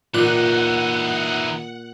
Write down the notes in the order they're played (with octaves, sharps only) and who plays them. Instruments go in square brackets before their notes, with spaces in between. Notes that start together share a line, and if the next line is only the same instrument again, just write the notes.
[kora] A#2 [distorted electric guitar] E3 D#4 [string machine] F#5 [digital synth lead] F#6